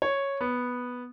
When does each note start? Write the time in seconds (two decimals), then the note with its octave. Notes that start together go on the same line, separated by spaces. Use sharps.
0.02 C#5
0.41 B3